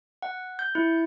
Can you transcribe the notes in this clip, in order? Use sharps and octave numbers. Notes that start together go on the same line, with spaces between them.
F#5
G6
E4